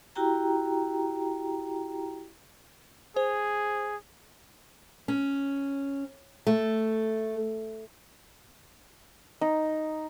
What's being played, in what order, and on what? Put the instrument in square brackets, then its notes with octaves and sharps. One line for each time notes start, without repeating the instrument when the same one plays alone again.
[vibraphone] E4 F#4 G4 G5 A#5
[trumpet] G#4 [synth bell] C5
[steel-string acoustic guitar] C#4
A3
[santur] D#4